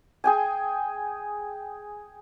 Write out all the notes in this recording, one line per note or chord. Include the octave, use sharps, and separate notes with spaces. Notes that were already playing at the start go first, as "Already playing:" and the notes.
G#4 G5 G#5